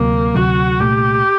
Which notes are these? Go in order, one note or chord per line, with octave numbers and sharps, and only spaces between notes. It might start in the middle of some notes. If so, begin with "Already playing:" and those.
Already playing: D2 C3 F#3 A#3
D2 C3 F#3 F#4
C2 A#2 A3 G4